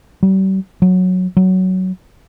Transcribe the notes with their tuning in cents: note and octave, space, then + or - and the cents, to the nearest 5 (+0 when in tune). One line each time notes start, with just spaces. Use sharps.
G3 -45
F#3 -10
F#3 +10